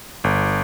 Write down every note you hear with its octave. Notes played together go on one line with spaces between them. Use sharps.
G1